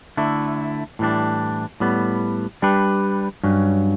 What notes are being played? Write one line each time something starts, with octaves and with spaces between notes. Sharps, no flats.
D3 A3 E4
A2 E3 G3 D4
A2 G3 B3
G3 D4 G4 B4
G2 F#3 C#4